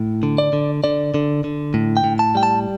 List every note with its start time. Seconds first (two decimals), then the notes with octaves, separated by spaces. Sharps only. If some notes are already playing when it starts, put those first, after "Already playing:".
Already playing: A2
0.23 D3
0.38 D5
0.53 D3
0.84 D3 D5
1.14 D3
1.44 D3
1.74 A2
1.97 G5
2.04 A2
2.19 A5
2.35 G3 G5
2.43 A5